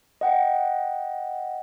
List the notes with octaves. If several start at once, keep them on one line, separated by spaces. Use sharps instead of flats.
D#5 F#5 G5